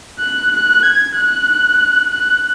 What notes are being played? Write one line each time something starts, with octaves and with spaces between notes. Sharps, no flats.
F#6
F#6
G#6
F#6
F#6